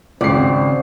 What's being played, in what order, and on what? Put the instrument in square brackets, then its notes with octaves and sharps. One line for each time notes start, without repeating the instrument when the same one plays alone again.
[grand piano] G#1 C7 [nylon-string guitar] C#3 D5 [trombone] C4